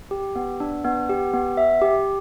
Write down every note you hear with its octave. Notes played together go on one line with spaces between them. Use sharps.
G4
B3
D4
B3
G4
B3
E5
G4